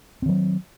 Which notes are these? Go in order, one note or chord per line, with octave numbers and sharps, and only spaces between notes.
D#3 F#3 C4